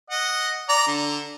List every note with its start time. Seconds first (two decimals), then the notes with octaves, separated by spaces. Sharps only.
0.10 D#5 F#5
0.69 D5 A#5
0.87 D3